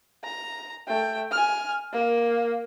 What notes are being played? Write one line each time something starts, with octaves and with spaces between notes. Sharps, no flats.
A#5
A3 G5
G#5 F6
A#3